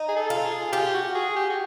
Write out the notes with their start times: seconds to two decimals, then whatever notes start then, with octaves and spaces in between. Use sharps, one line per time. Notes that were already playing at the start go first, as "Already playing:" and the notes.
Already playing: D#4
0.08 G#4
0.16 A4
0.30 F4
0.44 G#4
0.72 F4 G4
0.94 F#4
1.15 G#4
1.36 G4
1.50 F#4